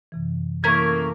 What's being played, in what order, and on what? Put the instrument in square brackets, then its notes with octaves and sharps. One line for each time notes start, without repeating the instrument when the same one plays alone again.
[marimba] F#2 C3 E3
[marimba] E3 E4 [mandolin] A3 C#4 A#4 [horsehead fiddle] A#3 [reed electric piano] G#6